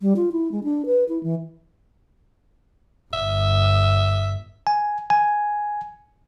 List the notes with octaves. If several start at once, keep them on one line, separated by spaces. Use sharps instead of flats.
G3
F4
E4
G#3
D4
B4
E4
E3
G1 E5
G#5
G#5